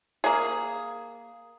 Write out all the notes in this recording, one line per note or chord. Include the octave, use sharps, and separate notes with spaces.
A#3 G#4